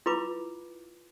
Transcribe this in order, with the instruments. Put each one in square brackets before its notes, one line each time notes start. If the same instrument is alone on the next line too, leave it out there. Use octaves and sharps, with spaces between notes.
[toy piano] E4 F4 B4 B5 D6